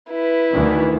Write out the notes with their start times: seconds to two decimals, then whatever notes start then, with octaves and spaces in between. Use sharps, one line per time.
0.11 E4 B4
0.53 D2 D#3 E3